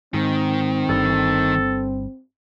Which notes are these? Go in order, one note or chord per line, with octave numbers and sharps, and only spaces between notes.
G#2 D#3 C4
G1 G2 A4